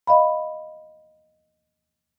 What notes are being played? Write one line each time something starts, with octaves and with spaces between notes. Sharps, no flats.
D#5 F5 B5